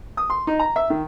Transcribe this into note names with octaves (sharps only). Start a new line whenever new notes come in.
D#6
C6
D#4
A#5
E5
D#3